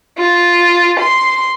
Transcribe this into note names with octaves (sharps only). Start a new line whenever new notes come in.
F4
C6